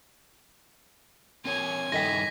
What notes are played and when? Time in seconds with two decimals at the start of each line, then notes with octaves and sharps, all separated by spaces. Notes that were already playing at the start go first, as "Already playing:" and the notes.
1.45 C4 A#4 C#5 G#5
1.92 G2 D#3 E4 A4 D#5 G5 A#6 B6